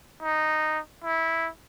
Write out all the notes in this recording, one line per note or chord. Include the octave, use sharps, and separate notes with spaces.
D#4
E4